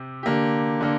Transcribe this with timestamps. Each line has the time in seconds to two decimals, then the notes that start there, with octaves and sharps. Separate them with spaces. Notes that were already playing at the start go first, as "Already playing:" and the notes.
Already playing: C3 G4
0.23 D3 A#3 G4
0.81 D3 A#3